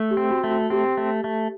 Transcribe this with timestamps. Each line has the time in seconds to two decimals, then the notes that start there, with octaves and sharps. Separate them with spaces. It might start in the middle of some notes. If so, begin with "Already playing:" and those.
Already playing: A3
0.11 G4
0.17 C4
0.31 F#4
0.44 A3
0.50 F#4
0.70 C4 G4
0.97 A3
1.24 A3